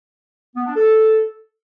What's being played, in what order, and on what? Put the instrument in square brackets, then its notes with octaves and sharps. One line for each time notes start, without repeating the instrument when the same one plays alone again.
[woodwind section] B3
D4
A4